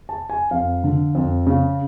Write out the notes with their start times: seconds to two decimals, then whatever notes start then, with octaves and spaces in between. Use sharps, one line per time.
0.09 A5
0.30 G#5
0.51 F2 F5
0.84 D3
1.15 F2
1.47 C#3